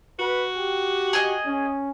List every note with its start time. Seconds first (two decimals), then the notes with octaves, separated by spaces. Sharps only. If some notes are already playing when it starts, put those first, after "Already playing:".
0.19 F#4 B4
0.56 G4
1.13 G#4 D#5
1.46 C#4